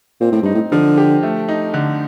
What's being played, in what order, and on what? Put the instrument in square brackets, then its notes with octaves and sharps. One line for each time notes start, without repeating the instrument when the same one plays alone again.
[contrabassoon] A#2 [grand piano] C4
[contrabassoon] A2
[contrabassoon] G2 [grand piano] D#4
[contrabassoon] A2
[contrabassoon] D3 [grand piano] F3
[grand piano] G4
A3
D#4
D3